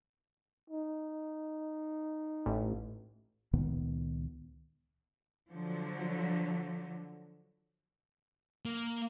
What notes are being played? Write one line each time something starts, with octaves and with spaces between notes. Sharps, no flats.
D#4
A1
C#2 A#2 D#3 B3
D3 F3 F#3
A#3